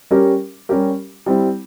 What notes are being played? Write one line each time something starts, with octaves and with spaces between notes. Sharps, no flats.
G3 C#4 G4 A#4
G3 C#4 G4 A#4
G3 C4 E4